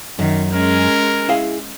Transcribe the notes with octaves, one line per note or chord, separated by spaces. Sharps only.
F#2 D#3
G#3 C#4 A#4
E4 G#4 F5